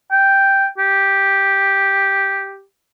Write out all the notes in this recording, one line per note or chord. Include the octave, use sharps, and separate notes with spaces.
G5
G4